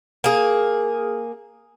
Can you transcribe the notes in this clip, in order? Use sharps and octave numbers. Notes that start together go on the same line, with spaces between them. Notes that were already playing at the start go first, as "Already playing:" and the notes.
A#3 G#4